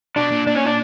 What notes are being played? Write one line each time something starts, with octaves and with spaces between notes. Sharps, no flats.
B2 D4
A#2
A#2 D4
C#4
D4